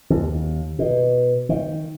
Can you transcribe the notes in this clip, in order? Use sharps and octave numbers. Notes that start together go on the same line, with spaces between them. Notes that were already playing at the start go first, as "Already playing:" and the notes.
D#2
B2
D#3